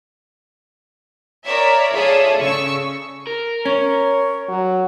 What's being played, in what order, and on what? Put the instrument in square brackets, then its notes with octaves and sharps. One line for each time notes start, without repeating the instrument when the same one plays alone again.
[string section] A#4 C#5 D5 E5
F4 G#4 A4 C#5 D5 E5
C#3 C#6 E6
[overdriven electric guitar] A#4
[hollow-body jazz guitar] C#4 [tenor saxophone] C#5
[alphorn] F#3